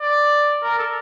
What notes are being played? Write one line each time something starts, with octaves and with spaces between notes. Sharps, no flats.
D5
A#4
A4